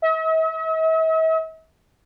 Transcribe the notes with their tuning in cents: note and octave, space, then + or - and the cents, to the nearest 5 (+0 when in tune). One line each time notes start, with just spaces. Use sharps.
E5 -45